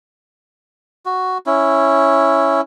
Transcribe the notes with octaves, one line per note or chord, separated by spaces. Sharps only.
F#4
C#4 E4